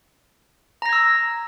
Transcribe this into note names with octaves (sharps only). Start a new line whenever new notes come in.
A#5 E6 G#6 A#6